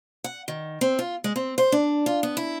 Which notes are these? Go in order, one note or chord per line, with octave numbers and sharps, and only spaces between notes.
F#5
D#3
C4
F4
G#3
C4
C5
D4
F4
B3
E4